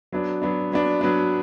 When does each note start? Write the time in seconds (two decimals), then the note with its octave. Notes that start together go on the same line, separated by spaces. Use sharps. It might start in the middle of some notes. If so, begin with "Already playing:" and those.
0.12 F#3 B3 D4
0.42 F#3 B3 D4
0.72 F#3 B3 D4
1.01 F#3 B3 D4